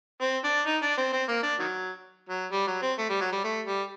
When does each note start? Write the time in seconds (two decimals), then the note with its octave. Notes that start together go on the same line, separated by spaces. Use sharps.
0.21 C4
0.44 D4
0.66 D#4
0.82 D4
0.98 C4
1.13 C4
1.28 A#3
1.43 D4
1.59 D#3 F#3
2.29 F#3
2.51 G3
2.67 F#3
2.82 C4
2.98 A3
3.10 G3
3.21 F#3
3.32 G3
3.44 A3
3.67 G3